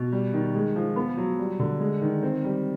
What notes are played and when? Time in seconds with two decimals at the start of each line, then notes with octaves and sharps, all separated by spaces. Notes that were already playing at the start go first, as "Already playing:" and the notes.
Already playing: B2
0.12 G3
0.33 D#3
0.55 G#3
0.76 F3
0.96 B3
1.17 F#3
1.39 G3
1.59 D3
1.80 G#3
2.02 D#3
2.23 C4
2.44 G3